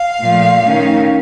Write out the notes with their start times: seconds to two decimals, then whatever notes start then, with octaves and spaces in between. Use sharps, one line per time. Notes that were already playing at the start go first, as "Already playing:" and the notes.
Already playing: F5
0.20 A#2 F3 A3
0.62 D#3 A3 C#4